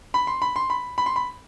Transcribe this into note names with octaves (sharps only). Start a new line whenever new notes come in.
B5
C6
B5
C6
B5
B5
C6
B5